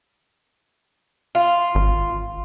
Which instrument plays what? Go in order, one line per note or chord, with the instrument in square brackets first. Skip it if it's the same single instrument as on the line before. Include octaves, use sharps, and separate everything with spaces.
[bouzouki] F4
[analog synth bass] G#1